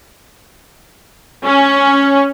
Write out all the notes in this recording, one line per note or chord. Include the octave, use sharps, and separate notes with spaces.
C#4